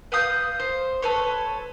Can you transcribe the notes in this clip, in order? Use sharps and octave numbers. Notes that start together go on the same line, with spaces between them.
B4 F5 D#6 G6
C5
A4 B4 C#5